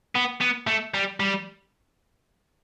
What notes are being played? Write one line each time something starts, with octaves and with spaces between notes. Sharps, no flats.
B3
B3
A3
G3
G3